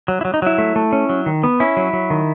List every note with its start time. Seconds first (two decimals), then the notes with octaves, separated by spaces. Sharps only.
0.08 F#3
0.21 E4
0.25 F#3
0.34 D#4
0.42 F#3 E4
0.58 A3
0.76 A3
0.92 C#4
1.09 F#3
1.26 D#3
1.43 B3
1.60 C#4 E4
1.77 F#3
1.93 F#3
2.10 D#3